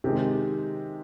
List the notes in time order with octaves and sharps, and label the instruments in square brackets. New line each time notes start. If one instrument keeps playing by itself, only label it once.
[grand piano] C3 D#3 G#3 [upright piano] G4